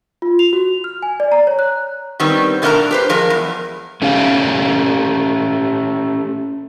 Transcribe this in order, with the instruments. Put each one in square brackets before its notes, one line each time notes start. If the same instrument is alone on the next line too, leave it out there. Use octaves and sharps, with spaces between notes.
[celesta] F4
F7
F#4
F6
G#5
D5
A#5
C#5
F#6
[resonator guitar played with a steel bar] D#3 G3 B3 C4
B2 D3 A3 D4 A#4 A#5
G4 B4 C5
F3 G#3 A#4
E2
[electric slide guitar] A3 C#4 G4 F5